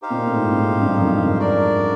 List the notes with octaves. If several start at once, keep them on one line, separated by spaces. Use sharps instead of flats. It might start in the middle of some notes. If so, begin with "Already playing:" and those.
D#4 G4 C5 F5
A#2
A2
G#2
A2
G#2
G2
F2
F#2
G#2
F#2
D4 F#4 A#4 D5